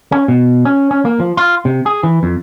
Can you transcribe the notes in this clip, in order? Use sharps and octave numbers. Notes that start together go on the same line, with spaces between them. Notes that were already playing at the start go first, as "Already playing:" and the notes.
C#4
B2
C#4
C#4
A#3
F3
F4
C3
G#4
E3
F2